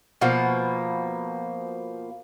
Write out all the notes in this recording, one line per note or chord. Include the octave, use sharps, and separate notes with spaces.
B2 F3 A#3